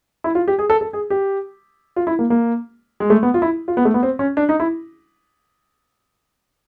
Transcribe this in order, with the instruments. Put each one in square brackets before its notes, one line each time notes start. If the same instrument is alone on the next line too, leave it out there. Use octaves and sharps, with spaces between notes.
[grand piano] E4
F4
G4
G#4
A4
A4
G#4
G4
F4
E4
A#3
A#3
G#3
A3
B3
F4
E4
F4
B3
A3
B3
C4
C#4
D4
D#4
E4